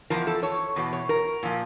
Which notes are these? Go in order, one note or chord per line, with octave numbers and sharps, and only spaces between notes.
E2 C3 F3 A#4
A4
C#5
E2 B2
C#5
A#4
A#2 F3